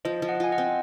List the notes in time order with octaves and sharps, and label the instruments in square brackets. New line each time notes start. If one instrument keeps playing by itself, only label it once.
[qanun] F3 [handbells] C5 D#5
[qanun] F3
[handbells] D#5 F#5
[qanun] F4 [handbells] G#5
[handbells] D#5 F#5
[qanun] C4